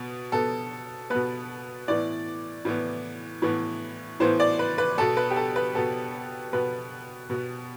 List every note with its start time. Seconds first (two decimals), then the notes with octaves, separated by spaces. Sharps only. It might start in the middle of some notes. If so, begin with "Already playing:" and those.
Already playing: B2 B3
0.32 B2 B3 A4
1.10 B2 B3 B4
1.88 A2 E3 B3 D5
2.65 A2 E3 B3
3.42 A2 E3 B3
4.20 A2 E3 B3 C5
4.40 D5
4.59 B4
4.78 B4
4.98 B2 B3 A4
5.17 B4
5.30 G4
5.36 A4
5.56 B4
5.75 B2 B3 A4
6.53 B2 B3 B4
7.30 B2 B3